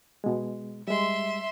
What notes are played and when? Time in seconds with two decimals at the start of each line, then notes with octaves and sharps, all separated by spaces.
0.24 B2 G#3
0.88 G3 G#3 E5 C6